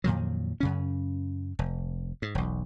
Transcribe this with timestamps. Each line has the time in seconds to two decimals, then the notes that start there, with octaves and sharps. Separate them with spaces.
0.04 F2 A#2 D#3 F#3
0.60 F#2 C#3 C#4
1.59 F1
2.22 G#2
2.35 E1 B1